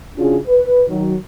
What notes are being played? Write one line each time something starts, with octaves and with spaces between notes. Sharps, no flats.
C#3 C#4 D4 F4 F#4 G#4
B4
D#3 F#3